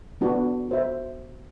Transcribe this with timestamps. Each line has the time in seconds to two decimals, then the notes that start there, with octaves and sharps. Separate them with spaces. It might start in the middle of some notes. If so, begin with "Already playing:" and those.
0.21 B3 D4 F#4
0.69 F#4 C5 E5